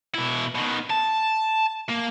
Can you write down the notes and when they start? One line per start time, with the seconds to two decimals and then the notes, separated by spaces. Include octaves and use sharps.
0.14 B2 E4
0.55 B2 D#3
0.90 A5
1.89 A#3